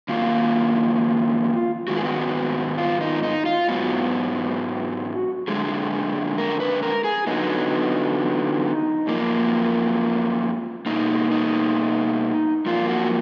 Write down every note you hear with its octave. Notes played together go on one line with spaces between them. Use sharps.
F#2 D#3 A#3 F4
G#2 D#3 G#3 B3 F#4
G#4
F#4
F4
D#4
D#4
F4
G#2 F#3 B3 F#4
F#2 D3 G#3 G#4
A#4
B4
A#4
G#4
D3 F#3 B3 D#4
F#2 F3 A#3
B2 A#3 D#4
D#4
F#2 F3 A#3 F4
F#4